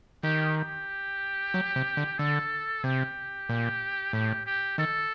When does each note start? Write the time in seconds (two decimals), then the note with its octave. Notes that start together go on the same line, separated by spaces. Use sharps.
0.23 D#3 G4
0.57 G4
1.54 F#3
1.76 C3
1.97 D3
2.19 D3 A4
2.84 C3 G4
3.49 A#2
4.13 A2 G4
4.46 G4
4.78 D#3 A4